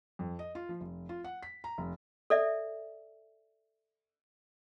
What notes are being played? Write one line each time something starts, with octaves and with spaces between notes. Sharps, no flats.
F2
D#5
F4
F3
F1
F4
F#5
B6
A#5
F1
A4 D5 E5